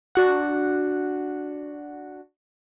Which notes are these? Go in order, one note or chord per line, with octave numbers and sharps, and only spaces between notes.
D4 F#4 F#5